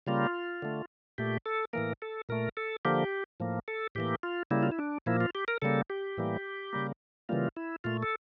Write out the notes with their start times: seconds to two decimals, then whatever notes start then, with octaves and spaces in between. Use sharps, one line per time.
0.07 C#3 G3 A#3 F4
0.62 D3 A3
1.18 A#2 A3 G4
1.46 A4
1.73 A2 E3 A#3 A#4
2.02 A4
2.29 A#2 A3 A#4
2.57 A4
2.85 D3 F3 A#3 G4
3.40 A2 F3 A#3
3.68 A4
3.95 A2 E3 A#3 G4
4.23 F4
4.51 C#3 G3 A#3 E4
4.63 F4
4.71 E4
4.79 D4
5.06 A#2 F3 A#3 E4
5.20 F4
5.35 G4
5.48 A#4
5.62 C#3 G3 A#3 A4
5.90 G4
6.17 A2 E3 G3 A#3
6.73 C#3 G3 A#3
7.29 C#3 E3 G3 A#3 F4
7.56 E4
7.84 A#2 A3 F4
8.03 A4